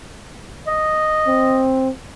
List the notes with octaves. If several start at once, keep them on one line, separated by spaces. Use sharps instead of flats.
D#5
C4